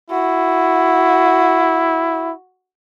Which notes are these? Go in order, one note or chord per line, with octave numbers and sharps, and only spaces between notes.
E4 F#4